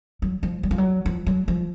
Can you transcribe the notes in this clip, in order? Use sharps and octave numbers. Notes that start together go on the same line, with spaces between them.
F#3
F3
F#3
F3
F#3
F3
F#3
F3